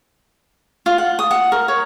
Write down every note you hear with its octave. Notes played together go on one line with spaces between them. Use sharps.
F4
F#5
D#6
F#5
A#4
C#5